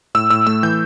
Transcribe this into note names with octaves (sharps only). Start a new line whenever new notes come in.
A2 E6
A2 E6
A3 E6
E3 G6